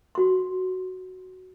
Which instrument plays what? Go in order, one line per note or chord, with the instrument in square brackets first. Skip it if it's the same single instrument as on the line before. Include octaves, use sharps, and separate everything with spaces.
[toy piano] F#4 C6